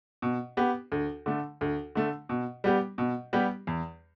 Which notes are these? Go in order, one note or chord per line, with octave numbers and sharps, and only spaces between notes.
B2
B3 G4
D2
D3 A3
D2
D3 A3
B2
G3 B3 G4
B2
G3 B3 G4
E2